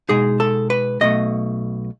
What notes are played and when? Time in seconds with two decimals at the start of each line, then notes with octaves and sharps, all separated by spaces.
0.09 B2 G#3 D#4 G#4
0.40 A4
0.70 B4
1.01 B1 B2 A3 D#5